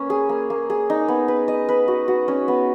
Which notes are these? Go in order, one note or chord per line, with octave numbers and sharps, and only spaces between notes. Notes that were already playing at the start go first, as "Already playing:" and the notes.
Already playing: A#3 C#4 B4
G#4
A#3
A#3
G#4
D#4
B3
B4
D#5
B4
F#4
F#4
C#4
B3